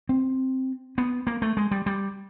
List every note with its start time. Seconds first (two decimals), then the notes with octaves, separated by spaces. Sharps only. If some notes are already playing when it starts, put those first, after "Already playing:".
0.09 C4
0.98 B3
1.27 A#3
1.42 A3
1.57 G#3
1.71 G3
1.86 G3